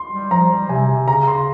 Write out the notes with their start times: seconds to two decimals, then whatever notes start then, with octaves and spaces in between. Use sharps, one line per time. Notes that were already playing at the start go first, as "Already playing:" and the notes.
Already playing: C6
0.12 G3
0.31 F3 A#5
0.50 G3
0.69 C3 G#5
0.89 C3
1.08 C#3 A#5
1.28 C6